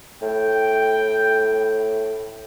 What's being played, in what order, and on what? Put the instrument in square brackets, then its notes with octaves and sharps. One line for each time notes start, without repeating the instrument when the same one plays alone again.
[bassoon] A2 [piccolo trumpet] G5